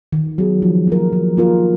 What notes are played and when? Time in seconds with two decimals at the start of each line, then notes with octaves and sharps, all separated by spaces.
0.13 D#3
0.38 F#3 B3 D#4 G#4
0.62 F3
0.87 A#3 F4 A#4
1.13 F3
1.37 A#3 F4 A#4